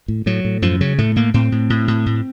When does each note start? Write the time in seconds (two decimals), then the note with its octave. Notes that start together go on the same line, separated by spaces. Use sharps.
0.08 A2
0.26 A2 F#3
0.45 A2
0.62 F#2 F3
0.81 C#3 F#3
0.98 A2 A3
1.16 A2 A#3
1.34 A2 C4
1.52 A2
1.70 A2
1.88 A2
2.06 A2